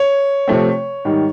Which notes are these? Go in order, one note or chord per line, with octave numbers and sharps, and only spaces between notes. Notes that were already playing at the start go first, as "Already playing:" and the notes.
Already playing: C#5
C3 F3 A3 C4
G#2 D#3 G3